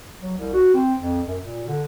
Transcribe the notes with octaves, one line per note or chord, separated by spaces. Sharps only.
F#3
C2
F#4
C4
F2
F#2
A#2
D3